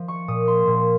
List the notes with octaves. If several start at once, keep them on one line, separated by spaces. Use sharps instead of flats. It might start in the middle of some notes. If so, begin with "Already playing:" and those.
Already playing: F3
C#6
A#2 D#6
C6
A#2